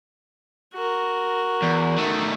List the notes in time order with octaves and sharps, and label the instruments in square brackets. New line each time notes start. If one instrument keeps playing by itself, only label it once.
[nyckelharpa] F#4 A#4
[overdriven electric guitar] E2
D#3 A3